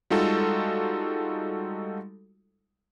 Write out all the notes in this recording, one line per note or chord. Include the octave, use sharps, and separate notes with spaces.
G3 G#3 D#4 F4 F#4 A4